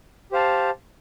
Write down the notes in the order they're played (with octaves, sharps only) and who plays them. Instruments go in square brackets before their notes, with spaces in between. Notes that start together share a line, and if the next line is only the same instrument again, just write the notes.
[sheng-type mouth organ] G4 C5 F5 A5